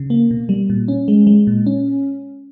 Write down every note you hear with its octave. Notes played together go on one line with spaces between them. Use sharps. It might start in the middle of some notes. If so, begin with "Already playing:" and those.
Already playing: C#3
A#3
B2
G3
A#2
C#4
G#3
G#3
A#2
C#4